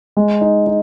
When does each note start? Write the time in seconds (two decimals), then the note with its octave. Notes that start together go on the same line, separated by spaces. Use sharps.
0.17 G#3
0.41 D#4
0.67 D#4